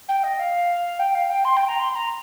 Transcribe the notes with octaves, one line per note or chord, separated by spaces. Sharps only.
G5
D#5
F5
G5
F5
G5
C6
G5
A#5
C6
C6
A#5